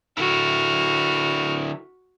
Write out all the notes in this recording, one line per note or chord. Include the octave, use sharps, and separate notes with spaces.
D3 E4 F#4 F6